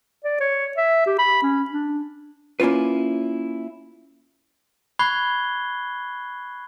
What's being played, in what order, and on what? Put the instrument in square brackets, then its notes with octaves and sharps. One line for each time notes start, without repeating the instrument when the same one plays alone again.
[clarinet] D5
C#5
E5
G4
B5
C#4
D4
[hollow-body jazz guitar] A#3 C#4 E4 F4 B4
[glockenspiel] B5 C#6 F#6 G#6 C7 G7